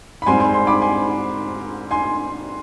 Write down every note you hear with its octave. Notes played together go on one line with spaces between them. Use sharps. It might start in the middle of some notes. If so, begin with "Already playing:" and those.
B5
G#2 G3 C4 G#5 C6
G#5 C6
G#5 C6
B5 D6
G#5 C6
G#5 C6